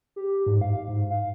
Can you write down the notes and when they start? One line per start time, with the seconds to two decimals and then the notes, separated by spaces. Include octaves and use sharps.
0.16 G4
0.46 G#2
0.61 F5
0.88 G#2
1.11 F5